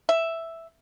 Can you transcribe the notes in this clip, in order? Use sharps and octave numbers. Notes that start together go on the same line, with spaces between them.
E5